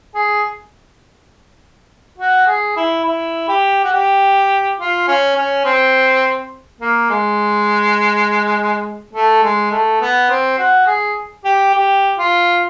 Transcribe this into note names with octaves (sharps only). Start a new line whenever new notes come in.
G#4
F#4
G#4
E4
E4
G4
F#4
G4
F4
C#4
C#4
C4
A#3
G#3
A3
G#3
A3
B3
C4
F#4
G#4
G4
G4
F4